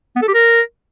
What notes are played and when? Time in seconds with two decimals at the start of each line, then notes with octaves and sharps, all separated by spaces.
0.16 B3
0.22 A4
0.28 G4
0.34 A#4